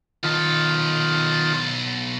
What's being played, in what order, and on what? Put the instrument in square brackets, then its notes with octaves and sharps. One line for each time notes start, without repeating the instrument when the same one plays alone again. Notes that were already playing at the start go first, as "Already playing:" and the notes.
[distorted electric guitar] B1 A4 [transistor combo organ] D#3 F4